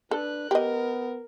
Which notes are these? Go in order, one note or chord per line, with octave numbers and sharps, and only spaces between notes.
D4 A4 B4 F#6
B3 G4 A#4 D#5